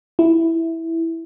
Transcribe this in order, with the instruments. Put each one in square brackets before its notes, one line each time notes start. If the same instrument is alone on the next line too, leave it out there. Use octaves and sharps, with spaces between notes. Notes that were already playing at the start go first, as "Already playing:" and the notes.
[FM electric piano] E4